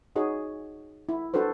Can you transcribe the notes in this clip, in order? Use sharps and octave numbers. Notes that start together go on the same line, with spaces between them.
D#4 F#4 G#4 C#5 D#5
E4
D4 F#4 A4 B4 C5